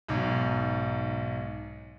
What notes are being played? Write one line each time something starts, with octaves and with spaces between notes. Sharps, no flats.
B1 G#2